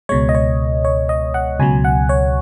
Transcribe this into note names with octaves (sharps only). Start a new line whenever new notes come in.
C#2 B2 G#3 C#5
D#5
C#5
C#5
D#5
F#5
C#2 B2 F#3 G#5
F#5
C#5